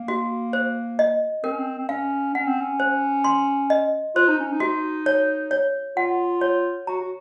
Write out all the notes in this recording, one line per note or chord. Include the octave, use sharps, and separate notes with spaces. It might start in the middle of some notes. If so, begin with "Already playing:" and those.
Already playing: A#3
F#4
C5
D#5
C4 A#4
C#4
C4
C4
C#4 F5
C#4 F#5
C4
C#4
C5
C6
D#5
F4 C5
D#4
C#4
D#4
F#4
C#5
C#5
F4 F#5
C#5
F#4 A#5
F#4